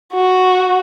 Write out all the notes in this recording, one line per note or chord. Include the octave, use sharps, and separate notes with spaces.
F#4